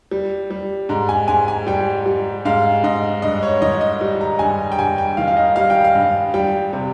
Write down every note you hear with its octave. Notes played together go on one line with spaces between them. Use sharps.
G3
G3
G#2 A#5
G#5
G#2 G#5
G#5
G3 G5
G3
G#2 F5
G#2 D#5
G2 D#5
C#5
D#3 D#5
D#5
G3
A#5
G2 G#5
G5
G2 G#5
G5
D#3 F5
F5
D#5
G3 F5
G5
F5
G2
G3 G5
C3